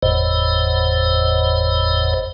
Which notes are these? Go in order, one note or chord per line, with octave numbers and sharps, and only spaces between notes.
F#1 E2 A2 C5 D#5